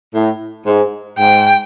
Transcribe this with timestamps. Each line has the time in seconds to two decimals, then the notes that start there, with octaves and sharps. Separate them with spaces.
0.14 A2
0.66 G#2
1.19 G#2 G5